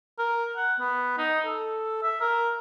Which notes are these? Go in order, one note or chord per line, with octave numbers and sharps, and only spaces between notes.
A#4
F#5
B3
D#4
A4
E5
A#4